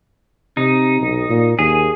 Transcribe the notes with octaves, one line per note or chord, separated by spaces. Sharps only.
C3 D#4
B1
A#2
D#2 G#4